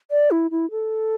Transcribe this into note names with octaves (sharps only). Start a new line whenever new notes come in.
D5
E4
E4
A4